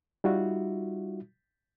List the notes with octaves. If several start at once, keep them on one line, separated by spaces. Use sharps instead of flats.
G3 D#4 F4 F#4 E5